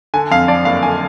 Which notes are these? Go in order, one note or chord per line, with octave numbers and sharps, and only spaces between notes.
D3 G#5
F2 F5
F3 D5
F#1 F5
D3 G#5